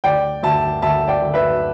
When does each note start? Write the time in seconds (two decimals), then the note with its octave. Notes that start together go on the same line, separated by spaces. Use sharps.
0.04 D2 D5 G5
0.43 D2 E5 A5
0.82 D2 E5 A5
1.08 D5 G5
1.21 D2
1.34 B4 E5